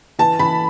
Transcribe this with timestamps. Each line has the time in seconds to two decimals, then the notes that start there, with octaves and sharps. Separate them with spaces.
0.19 E3 A5
0.39 E3 B5